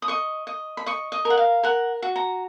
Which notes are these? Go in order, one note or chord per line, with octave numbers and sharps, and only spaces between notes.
D#6
D#5 C#6
D#5
B5
D#5 C#6
D#5
A#4
F#5
F5
A#4 F#5
F#4
A#5